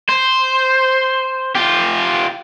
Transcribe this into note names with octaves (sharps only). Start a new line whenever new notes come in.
C5
F4 G4